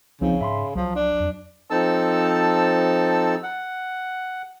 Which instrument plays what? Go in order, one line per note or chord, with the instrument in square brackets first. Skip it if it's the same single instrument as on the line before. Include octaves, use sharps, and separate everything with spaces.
[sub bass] C2 [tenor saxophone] C#3 [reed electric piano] F3 C4 D#4
[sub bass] G#2 [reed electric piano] E5 B5 C6
[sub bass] C2 [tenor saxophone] F3 [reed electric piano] F#3
[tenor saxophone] D4
[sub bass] F2
[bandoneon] F3 C4 D#4 A4 A5 E6
F#5